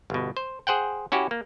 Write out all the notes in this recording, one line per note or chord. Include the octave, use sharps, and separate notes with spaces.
G1 B2
C5
G#4 C5 F#5 G5
C#4 E4 F#4 G4
A#3